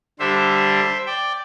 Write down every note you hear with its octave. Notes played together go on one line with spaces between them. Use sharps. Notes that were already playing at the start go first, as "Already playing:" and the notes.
D3 G3 D4 C5 E5
D5 G5